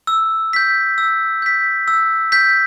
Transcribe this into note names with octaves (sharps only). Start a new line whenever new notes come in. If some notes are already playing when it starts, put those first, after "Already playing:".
E6
G6 B6
E6
G6 B6
E6
G6 B6